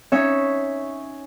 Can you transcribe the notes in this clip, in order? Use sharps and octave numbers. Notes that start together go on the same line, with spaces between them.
C#4 D#4 C#5 E5